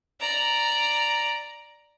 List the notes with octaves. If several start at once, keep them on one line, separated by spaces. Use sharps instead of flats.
D5 A#5